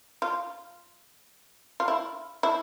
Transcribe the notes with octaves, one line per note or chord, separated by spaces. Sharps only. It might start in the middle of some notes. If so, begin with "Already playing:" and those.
F4
F4
E4
E4